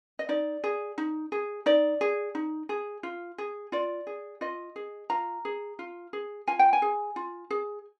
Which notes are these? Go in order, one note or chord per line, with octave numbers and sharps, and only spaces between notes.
D#5
D#4 D5
G#4
D#4
G#4
D#4 D5
G#4
D#4
G#4
F4
G#4
F4 D5
G#4
F4 D#5
G#4
F4 A#5
G#4
F4
G#4
F4 G#5
G5
G#5
G#4
F4
G#4